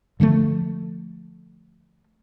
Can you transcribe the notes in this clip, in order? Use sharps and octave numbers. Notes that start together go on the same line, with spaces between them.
D3 F3 G#3 A3